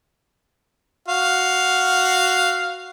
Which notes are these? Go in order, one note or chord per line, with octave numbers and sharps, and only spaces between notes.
F#4 F5